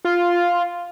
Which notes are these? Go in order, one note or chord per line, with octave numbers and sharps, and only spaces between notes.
F4